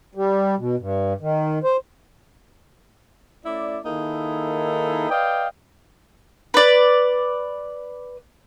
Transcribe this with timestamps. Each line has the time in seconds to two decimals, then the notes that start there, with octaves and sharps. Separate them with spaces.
0.15 G3
0.58 B2
0.80 G2
1.21 D#3
1.64 C5
3.45 A3 C#4 E4 D5
3.84 D#3 A#3 D#4 E4 G#4 A4
5.10 B4 D5 D#5 F5 G5
6.54 B4 D5